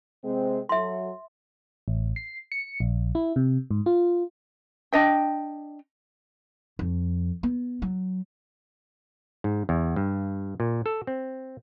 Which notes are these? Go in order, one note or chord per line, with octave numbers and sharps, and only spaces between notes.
C3 G#3 C4
F#3 A4 E5 C6
A1
C7
C#7
A#1
E4
C3
G#2
F4
D4 D#5 G5
F2
B3
F#3
G#2
E2
G2
A#2
A4
C4